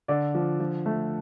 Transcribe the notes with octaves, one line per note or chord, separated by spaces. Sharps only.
D3 D5
F3
F3
A3